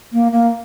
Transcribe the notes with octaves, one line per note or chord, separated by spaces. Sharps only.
A#3
A#3